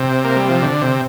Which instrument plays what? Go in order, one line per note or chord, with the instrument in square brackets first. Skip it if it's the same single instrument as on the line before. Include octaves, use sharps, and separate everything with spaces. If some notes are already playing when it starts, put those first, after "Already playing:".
Already playing: [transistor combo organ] C3
A#3
G3
F3
D3
C3